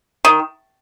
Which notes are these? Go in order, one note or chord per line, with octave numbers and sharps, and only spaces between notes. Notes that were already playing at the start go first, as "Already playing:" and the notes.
D#3